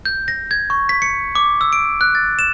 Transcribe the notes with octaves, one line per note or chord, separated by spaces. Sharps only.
G6
A#6
G#6
C#6
B6
C#7
D6
E6
D7
F#6
A6
E7